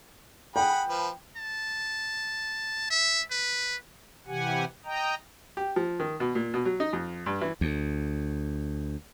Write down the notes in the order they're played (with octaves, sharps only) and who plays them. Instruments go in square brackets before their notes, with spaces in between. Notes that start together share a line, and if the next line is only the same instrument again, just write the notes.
[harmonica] G#4 F#5 B5 [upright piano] G5
[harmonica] F3 B4
[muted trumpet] A5
E5
B4
[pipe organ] C3 E3 G4 F#5 G#5
D#5 G5 A#5
[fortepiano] G4
F3
D#3
B2
A#2
B2
F#3
D#4
F2
G2
E3
[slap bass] D2